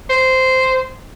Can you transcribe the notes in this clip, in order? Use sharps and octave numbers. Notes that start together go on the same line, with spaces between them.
C5